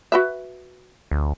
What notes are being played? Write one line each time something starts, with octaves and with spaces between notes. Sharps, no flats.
F#4 B4 E5
D2